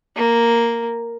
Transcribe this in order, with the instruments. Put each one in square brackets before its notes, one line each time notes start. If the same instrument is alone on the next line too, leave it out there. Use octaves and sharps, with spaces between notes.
[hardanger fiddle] A#3